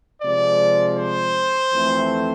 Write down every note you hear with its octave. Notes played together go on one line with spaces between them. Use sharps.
C3 F3 G#3 D5
C5
F2 E3 A3 C4